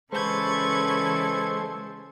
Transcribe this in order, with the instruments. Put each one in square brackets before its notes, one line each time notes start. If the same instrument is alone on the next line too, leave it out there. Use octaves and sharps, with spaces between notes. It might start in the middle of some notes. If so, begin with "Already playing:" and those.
[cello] C#3 E3 [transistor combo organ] G#3 C5 [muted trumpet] A4 [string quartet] B4 C#6 G#6